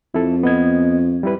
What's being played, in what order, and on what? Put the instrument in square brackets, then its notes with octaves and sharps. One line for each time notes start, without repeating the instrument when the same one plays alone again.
[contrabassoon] F2 [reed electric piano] E4 A4
[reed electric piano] B3 D#5 G#6
G3 E4 B4